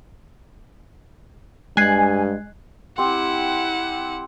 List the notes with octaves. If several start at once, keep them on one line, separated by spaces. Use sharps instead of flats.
G2 G#3 G#5 F#6 G#6 C7
C4 E4 G4 F#5